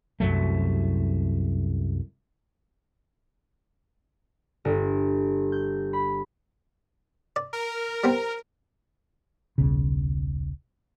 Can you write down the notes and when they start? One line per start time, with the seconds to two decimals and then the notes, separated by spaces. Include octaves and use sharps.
0.20 C2 F#2 F#3 A3
4.65 G1
5.52 G6
5.93 B5
7.36 D5
7.53 A#4
8.04 G3 B3 C4
9.58 D#1 B1 C#3